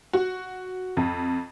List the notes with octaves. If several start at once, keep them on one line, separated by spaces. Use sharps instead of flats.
F#4
F2